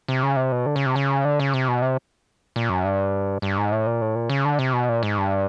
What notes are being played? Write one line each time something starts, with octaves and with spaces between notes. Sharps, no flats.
C3
C#3
C3
B2
D3
C#3
C3
C#3
D3
C#3
C3
B2
C3
A#2
F#2
G2
G2
G#2
A2
A#2
A2
A#2
C#3
D3
C3
B2
A#2
G#2
G2